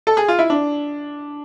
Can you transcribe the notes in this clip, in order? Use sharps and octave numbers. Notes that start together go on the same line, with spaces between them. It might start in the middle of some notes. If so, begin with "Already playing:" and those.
A4
G#4
F4
E4
D4